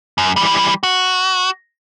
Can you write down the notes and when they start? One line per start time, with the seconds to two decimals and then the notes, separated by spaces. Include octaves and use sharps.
0.18 F#2
0.36 E3 G3
0.83 F#4